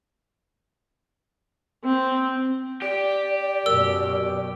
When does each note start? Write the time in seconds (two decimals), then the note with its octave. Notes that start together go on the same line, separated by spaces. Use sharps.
1.84 C4
2.82 G4 D5
3.66 F#2 B2 A#4 E6